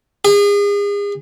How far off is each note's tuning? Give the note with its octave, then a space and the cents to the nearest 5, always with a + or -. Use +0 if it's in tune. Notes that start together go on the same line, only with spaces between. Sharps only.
G#4 -35